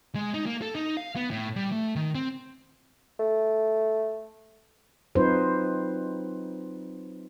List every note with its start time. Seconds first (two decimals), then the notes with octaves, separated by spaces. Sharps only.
0.15 G#3
0.34 D#4
0.46 A#3
0.62 A4
0.75 D#4
0.97 F5
1.16 B3
1.31 A2
1.56 G3
1.72 A3
1.96 D#3
2.15 C4
3.20 A3
5.15 F#3 C4 D#4 F4 B4 C5